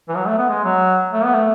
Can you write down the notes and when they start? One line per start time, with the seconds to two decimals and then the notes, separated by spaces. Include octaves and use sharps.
0.08 E3
0.16 F#3
0.27 A3
0.38 B3
0.49 G#3
0.64 F#3
1.13 A3
1.24 B3
1.34 A3